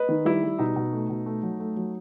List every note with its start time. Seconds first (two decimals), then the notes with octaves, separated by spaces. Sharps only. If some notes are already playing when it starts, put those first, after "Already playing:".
Already playing: B4 D#5
0.09 D#3
0.25 G3 E4
0.43 G3
0.59 B2 D#4
0.76 B2
0.93 A3
1.10 B2
1.26 A3
1.43 F#3
1.60 A3
1.76 F#3